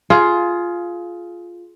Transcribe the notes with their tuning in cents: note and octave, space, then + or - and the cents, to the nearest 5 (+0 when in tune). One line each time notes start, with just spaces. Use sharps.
F4 +0 G#4 +20